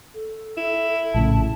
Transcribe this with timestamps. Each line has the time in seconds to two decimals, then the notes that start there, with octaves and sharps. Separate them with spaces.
0.15 A4
0.57 E4
1.14 A#1 A2 C#3 A5